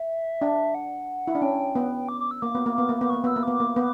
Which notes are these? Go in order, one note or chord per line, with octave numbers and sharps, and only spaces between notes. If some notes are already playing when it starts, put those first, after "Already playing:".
Already playing: E5
D4
F#5
E4
D4
C#4 G5
B3
D6
D6
E6
A#3 D6
B3
A#3
B3
A#3
B3
A#3 C#6
B3 E6
A#3
B3 D6
A#3
B3